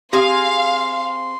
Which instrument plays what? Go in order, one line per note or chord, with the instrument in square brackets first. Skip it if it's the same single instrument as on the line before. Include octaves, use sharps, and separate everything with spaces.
[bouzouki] C4 G#4 G#5 [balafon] G4 [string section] F5 [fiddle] C6